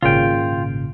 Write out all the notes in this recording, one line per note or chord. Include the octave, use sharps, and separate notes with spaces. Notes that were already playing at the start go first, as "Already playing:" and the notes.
G#1 A#2 C#3 F4 G5